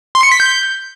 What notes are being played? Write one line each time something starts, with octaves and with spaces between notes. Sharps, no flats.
C6
C#7
B6
G6